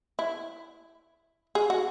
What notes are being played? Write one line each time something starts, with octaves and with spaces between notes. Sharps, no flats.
E4
G#4
F#4